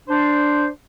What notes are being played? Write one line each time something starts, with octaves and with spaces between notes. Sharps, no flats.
D4 C5